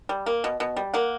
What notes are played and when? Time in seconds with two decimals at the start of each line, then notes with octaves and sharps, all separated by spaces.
0.09 G3
0.26 A#3
0.44 B2
0.60 B2
0.76 G3
0.94 A#3 F#5